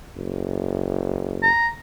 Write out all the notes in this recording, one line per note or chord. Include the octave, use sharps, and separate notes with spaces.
F#1
A#5